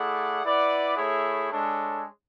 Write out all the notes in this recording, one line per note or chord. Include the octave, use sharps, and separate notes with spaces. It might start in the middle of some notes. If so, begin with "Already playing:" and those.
Already playing: A3 E4 G#4 D5 F#5
E4 B4 D5 F#5
A3 E4 G#4 C#5
G#3 D4 A4 C#5